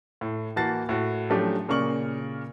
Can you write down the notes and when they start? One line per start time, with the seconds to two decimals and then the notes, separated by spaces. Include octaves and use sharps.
0.21 A2
0.56 E3 A#3 F#4 A5 A6 C7
0.89 A2 F#4
1.30 F3 F#3 A3 C#4 D4 G4
1.68 A#2 C#3 A#4 D5 C#6 F#7